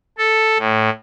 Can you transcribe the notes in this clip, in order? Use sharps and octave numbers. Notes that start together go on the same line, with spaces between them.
A4
A2